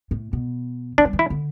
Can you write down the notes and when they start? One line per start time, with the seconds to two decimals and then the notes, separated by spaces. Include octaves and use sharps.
0.11 A2
0.33 B2
0.98 E3 D4
1.05 G3
1.13 E3
1.19 E4
1.30 D3